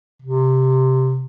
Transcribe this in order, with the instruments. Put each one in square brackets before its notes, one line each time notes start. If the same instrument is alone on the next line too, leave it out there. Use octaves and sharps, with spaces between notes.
[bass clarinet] C3